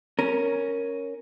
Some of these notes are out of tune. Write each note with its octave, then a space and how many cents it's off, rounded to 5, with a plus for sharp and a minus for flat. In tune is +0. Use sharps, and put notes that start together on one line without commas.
C#4 +0 A#4 +0